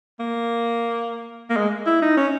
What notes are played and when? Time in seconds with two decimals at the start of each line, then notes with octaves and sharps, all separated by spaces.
0.20 A#3
1.50 A#3
1.57 G#3
1.87 E4
2.02 D#4
2.17 C#4